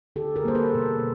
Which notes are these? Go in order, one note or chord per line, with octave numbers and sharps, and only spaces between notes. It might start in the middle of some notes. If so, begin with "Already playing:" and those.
D3 G4 A4
G#4 A#4
G3 A#3 C5
A4 B4
B2